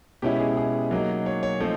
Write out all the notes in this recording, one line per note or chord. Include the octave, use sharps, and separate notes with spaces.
B2 G#3 C#4 E4 G4
G4
G#4
G#4
F#3 A#3 D#4
C#5
C#5
F3 A3 C4 D#4 C5